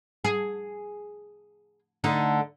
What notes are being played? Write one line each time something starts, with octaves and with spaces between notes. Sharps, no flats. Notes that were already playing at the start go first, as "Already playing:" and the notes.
G#4
D3 A3 D#4